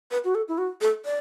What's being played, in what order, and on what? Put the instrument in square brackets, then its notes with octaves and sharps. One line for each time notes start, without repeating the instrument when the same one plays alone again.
[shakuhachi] B4
F#4
A4
E4
F#4
A4
D5